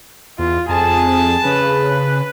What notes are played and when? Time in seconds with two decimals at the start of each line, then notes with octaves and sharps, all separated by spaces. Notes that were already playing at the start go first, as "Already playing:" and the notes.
0.39 E2 F4
0.69 F2 G#4 A5
1.45 C#3 B4